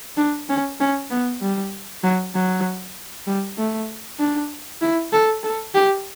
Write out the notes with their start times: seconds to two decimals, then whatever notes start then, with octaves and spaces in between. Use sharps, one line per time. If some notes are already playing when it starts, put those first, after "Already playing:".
0.17 D4
0.49 C#4
0.80 C#4
1.10 B3
1.41 G3
2.03 F#3
2.34 F#3
3.27 G3
3.58 A3
4.19 D4
4.82 E4
5.13 A4
5.43 A4
5.74 G4